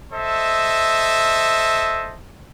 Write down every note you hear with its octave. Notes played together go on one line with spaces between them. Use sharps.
A4 C5 D#5 E5